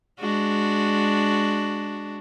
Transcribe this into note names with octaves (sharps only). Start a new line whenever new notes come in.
G#3 D4 F#4